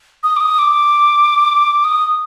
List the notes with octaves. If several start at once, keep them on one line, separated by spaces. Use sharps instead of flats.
D#6
D6
D#6
D6
D#6